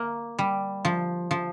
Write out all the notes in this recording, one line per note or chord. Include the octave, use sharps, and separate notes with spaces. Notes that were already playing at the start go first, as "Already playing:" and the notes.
Already playing: A#3
G3
F3
F3